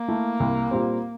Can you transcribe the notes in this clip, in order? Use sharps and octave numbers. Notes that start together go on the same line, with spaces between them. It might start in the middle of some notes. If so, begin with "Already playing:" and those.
Already playing: A#3
A3 E4
C2
A#2 G3 C4